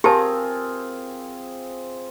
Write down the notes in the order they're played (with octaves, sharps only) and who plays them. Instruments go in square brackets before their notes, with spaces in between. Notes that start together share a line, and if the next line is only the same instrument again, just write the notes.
[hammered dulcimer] C4 F4 G#4 [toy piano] G4 A5 [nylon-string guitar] A#4